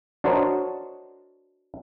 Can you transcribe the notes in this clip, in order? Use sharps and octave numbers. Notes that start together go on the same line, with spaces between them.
D4 F#4 A#4 C5 C#5 D#5